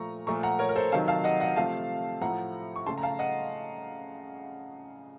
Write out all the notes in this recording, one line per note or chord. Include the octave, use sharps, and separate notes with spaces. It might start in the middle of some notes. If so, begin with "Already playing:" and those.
Already playing: A#2 F3 A3 A#5 C#6
A#2 F3 A3 A#5 C#6
F#5 A#5
A#4 C#5
A#4
A4 C5
C3 D#3 F#3 F5 A5
F5 A5
D#5 F#5
D#5 F#5
C3 F3 A3 F5 A5
A2 F3 A3 F#5 A#5
C#6
C#3 A3 A5 C6
A#5
F5 A5
D#5 F#5